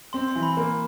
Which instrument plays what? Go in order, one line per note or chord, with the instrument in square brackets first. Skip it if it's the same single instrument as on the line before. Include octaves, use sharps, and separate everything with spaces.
[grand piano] C4 [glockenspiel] C6
[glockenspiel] C6
[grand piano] E3
[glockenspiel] B5
[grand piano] A#3